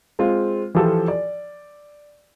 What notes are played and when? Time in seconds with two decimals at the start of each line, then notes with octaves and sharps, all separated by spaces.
0.19 G#3 C4 F4
0.75 E3 F3 F4 G4 A4
1.08 D5